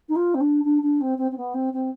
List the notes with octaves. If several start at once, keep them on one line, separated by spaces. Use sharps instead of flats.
D#4
F4
C4
D4
D4
D4
C4
C4
C4
B3
C4
C4